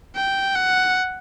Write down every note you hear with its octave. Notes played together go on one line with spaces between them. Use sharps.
G5
F#5